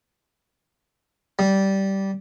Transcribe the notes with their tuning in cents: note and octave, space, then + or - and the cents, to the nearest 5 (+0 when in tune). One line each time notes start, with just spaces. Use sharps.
G3 -15